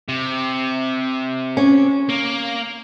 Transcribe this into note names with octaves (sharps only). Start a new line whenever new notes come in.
C3
C#4
A#3